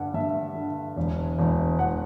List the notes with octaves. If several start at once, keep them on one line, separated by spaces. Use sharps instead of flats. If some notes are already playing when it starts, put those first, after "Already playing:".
Already playing: G2 D3 F#5
G2 E5
D3
E1
E1
E1 F#5